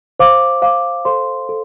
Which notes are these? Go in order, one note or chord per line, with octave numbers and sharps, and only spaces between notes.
C5 F5 D6
C5 F5 D6
A4 C5 F5 C6
A4